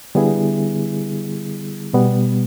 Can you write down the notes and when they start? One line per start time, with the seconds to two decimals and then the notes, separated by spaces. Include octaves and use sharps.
0.15 D3 G3 B3 E4 G#4
1.93 B2 G3 B3